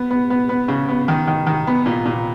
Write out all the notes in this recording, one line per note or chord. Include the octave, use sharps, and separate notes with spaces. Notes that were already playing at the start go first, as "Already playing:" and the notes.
Already playing: B3
B3
B3
B3
C#3
B3
D#3
D#3
D#3
B3
A#2
A#2